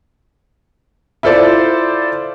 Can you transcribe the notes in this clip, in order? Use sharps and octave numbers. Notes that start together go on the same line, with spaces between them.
E4 F4 A4 C5 D5